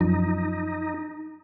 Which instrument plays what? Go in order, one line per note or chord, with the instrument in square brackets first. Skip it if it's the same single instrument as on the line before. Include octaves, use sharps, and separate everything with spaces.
[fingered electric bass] F#2 F3 [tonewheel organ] D#4